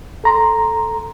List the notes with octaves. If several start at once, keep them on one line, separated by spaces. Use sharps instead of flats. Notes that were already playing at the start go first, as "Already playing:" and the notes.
A4 A#5 C6